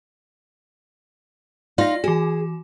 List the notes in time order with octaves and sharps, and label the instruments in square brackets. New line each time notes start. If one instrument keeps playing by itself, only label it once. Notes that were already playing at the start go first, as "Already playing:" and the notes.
[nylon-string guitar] D#4 F4 [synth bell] D5 A#6
[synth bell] E3 F#4 [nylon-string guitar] G#4